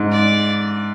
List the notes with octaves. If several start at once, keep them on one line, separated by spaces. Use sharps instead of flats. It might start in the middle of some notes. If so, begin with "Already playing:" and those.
Already playing: G#2
D5